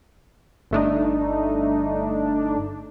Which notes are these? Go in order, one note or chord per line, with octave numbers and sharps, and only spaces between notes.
G1 A3 D4 D#4